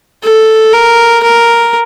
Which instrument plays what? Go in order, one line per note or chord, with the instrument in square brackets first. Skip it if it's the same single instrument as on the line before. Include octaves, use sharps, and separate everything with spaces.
[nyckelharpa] A4
A#4
A#4